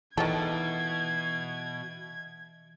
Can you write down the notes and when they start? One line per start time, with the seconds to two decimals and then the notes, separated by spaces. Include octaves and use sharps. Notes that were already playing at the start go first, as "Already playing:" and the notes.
0.17 B2 D#3 E3 F4 A4 G#6